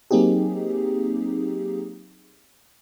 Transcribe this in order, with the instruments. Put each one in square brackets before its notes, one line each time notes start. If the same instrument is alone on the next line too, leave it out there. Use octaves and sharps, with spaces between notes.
[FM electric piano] F#3 A#3 C4 D#4 G4 G#4